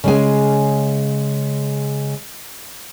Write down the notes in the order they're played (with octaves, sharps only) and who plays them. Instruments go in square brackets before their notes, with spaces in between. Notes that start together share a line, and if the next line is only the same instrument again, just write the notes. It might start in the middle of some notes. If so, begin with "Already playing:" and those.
[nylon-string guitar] C#3 G#3 G#5